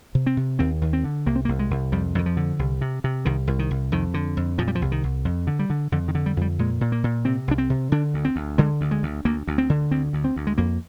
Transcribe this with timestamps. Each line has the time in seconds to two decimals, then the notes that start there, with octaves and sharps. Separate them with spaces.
0.15 C3
0.27 C4
0.37 C3
0.59 D#2 C4
0.82 D#2
0.93 C4
1.04 D3
1.26 C2 A#3
1.36 C4
1.45 A#3
1.48 C2
1.59 G#3
1.71 C2
1.92 F2 G3
2.15 F2 D#3
2.26 F3
2.37 D3
2.59 C2
2.81 C3
3.04 C3
3.25 C2 D#3
3.47 C2
3.59 D#3
3.71 C2
3.92 F2 D#3
4.14 D3
4.37 F2
4.58 A#2 F3
4.68 G3
4.75 F3
4.82 C2
4.92 D#3
5.04 C2
5.25 F2
5.47 D3
5.59 G3
5.70 D3
5.92 F2 D3
6.08 D#3
6.15 D3
6.26 G3
6.37 F2 G3
6.59 A#2 G#3
6.81 A#2
6.92 A#3
7.04 A#2
7.25 C3 C4
7.48 C2 D4
7.58 C4
7.70 C3
7.92 D3 D4
8.14 D2
8.25 C4
8.36 D2
8.58 D3 G#3
8.81 D2
8.91 G#3
9.03 D2
9.25 D2 A#3
9.47 D2
9.58 C4
9.70 D3
9.91 D2 C4
10.13 D2
10.24 C4
10.36 D2
10.47 G#3
10.58 F2 A#3